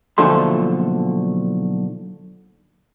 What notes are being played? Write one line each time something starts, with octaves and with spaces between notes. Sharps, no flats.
B1 A#2 D3 F3 A3 C6